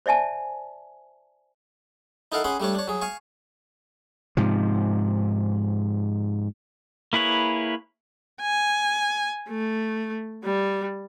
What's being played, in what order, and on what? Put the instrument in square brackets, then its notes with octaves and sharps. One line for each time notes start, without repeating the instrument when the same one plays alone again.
[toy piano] C5 D5 E5 G#5 A5
[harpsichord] D#4 E4 A4 A#4 F5 F#5
C#4 G#4 F#5 B5 C6
G3 A3 D4 C#5
D4 C#5
F#3 G#4
F5 G#5 C#6
[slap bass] G#2 C3 F3
[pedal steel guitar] A#3 E4 G#4 B4 C#5
[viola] G#5
A3
G3